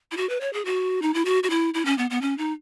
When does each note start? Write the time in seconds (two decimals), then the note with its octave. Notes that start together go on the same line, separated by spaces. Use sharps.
0.12 E4
0.17 F#4
0.29 B4
0.41 C#5
0.53 G#4
0.65 F#4
1.02 D#4
1.14 E4
1.25 F#4
1.43 F#4
1.50 E4
1.74 E4
1.85 C#4
1.98 B3
2.10 B3
2.22 C#4
2.38 D#4